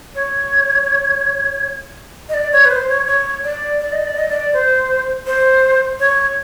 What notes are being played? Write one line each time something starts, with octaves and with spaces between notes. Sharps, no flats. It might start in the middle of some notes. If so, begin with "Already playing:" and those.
C#5
D#5
D5
C#5
B4
C5
C#5
C#5
D5
D5
D#5
D5
D#5
D5
C5
C5
C#5